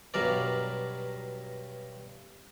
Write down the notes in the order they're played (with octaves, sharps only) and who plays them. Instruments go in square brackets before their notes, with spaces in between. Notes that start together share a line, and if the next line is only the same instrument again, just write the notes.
[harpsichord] G2 B2 F#3 A#4 D5